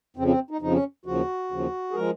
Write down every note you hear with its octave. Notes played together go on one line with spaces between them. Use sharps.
F2 C#3 F3 C4
C4
D#4
F2 C#3 F3 D#4
C#4
D#2 C#3 F3 F#4
D#2 C#3 F3
G#4
F3 G#3 A#4